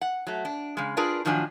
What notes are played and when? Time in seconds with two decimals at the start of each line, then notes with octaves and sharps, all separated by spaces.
0.01 F#5
0.27 F#3 A3
0.45 D4
0.77 C#3 G#3
0.97 D4 F4 G#4 A#4 B4 D5
1.25 A2 D#3 F3 F#3 D4 G#5